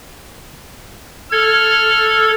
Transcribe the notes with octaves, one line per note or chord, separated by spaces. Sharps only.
A4 F6 G#6